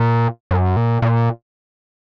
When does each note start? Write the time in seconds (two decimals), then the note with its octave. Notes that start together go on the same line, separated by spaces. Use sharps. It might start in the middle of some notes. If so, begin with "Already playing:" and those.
Already playing: A#2
0.51 F#2
0.77 A#2
1.02 A#2